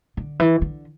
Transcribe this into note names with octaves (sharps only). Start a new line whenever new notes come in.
D3
E3
D3